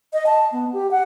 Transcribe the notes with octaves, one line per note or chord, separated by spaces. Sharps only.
D#5
A5
B3
G4
F#5